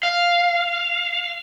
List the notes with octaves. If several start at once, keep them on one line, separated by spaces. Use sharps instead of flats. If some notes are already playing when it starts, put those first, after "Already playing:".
F5